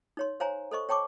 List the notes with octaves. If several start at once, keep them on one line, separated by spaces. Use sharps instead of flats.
D#4 C#5 C6
C5 C#5 F5 G#5 A#5
A4 C5 D#5 C#6
C#5 G5 A5 C#6 D6